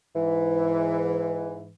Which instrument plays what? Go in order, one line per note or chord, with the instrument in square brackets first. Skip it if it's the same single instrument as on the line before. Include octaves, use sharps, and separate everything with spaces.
[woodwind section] G#2 E3